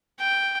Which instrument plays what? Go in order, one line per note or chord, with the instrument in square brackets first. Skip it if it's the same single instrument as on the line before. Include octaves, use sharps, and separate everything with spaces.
[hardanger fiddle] G5